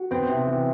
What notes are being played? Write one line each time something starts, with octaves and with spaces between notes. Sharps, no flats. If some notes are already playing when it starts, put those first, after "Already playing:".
Already playing: F#4
B3 C4
C3
E3